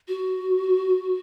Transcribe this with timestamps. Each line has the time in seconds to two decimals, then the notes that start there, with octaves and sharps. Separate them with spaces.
0.08 F#4